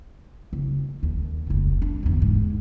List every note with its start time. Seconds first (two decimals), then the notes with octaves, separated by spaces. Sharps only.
0.53 F#1
1.03 D#2
1.47 F1 C#2
1.82 D4
2.03 G1 E2
2.22 G#2